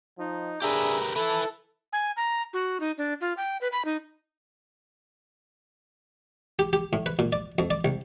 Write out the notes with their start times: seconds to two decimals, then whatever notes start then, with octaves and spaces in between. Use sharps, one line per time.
0.18 F3 D#4
0.62 D4 G4 G#4 A#4 B4 E5
1.16 E4 A4 B4
1.93 G#5
2.17 A#5
2.53 F#4
2.80 D#4
2.98 D4
3.21 F4
3.37 G5
3.61 B4
3.72 B5
3.85 D#4
6.59 G4
6.73 G4
6.93 A2
7.06 B4
7.19 A#2
7.33 D5
7.59 F2
7.70 D5
7.85 C2